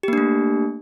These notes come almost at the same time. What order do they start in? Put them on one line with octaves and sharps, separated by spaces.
G4 A#3 D4 A3